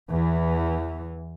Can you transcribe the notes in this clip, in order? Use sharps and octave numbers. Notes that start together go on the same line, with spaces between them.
E2 E3